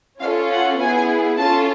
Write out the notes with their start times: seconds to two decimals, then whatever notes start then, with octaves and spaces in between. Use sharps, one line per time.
0.21 C#4 F4 A4 F5
0.51 F#5
0.79 B3 E4 G#4 G#5
1.38 C#4 F4 A4 A5